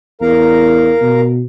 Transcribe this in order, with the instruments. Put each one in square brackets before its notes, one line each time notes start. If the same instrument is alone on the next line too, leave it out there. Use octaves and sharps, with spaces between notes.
[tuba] E2 [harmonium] A#4 F5 A#5
[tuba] B2